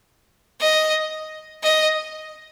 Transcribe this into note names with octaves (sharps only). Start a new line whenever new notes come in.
D#5
D#5